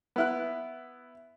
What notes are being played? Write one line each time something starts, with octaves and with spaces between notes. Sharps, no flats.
B3 E4 F#6